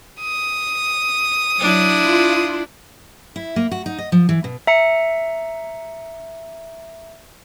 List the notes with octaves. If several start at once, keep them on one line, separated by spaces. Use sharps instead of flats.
D#6
F#3 D4 E4
F4
E4
A#3
F#4
D#4
D#5
F3
E3
B2
E5 A#5 C#7